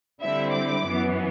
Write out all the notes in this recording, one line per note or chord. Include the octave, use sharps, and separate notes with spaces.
D3 G3 C4 E4 E5
D6
F#2 E3 B3